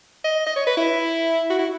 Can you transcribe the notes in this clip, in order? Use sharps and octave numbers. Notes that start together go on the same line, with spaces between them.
D#5
D#5
C#5
B4
E4
F#4
E4